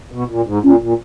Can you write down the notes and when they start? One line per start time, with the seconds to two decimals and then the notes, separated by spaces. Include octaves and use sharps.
0.12 B2
0.29 A#2
0.46 G#2
0.64 A#2 C#4
0.81 A#2